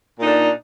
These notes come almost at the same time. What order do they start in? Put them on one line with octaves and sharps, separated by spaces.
A#2 D#4 D4